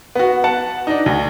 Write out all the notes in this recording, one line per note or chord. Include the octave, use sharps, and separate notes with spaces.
B3 F#4
F#5 A5
D4 D#4
D2